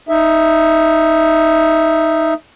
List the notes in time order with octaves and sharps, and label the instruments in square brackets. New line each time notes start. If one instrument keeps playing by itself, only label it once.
[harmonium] D#4 E5